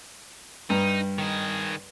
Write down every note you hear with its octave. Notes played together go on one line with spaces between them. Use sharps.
G2 D#4
D#3 G#4